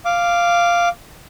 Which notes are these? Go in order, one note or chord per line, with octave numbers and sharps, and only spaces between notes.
F5 D6